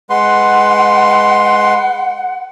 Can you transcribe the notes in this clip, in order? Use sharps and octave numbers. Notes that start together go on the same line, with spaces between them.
G#3 B4 F#5 C6